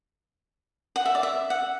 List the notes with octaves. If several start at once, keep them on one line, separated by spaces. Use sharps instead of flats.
F#5
E5
D5
E5
F#5